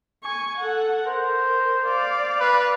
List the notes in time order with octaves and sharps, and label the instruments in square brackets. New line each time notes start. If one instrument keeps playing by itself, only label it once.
[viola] G#5 C#6
A4 F#5
[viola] A#4 [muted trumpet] C5
[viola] D5 F5
[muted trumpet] B4